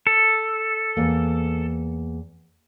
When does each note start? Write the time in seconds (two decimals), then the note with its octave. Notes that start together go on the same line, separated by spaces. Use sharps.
0.07 A4
0.97 E2 A#3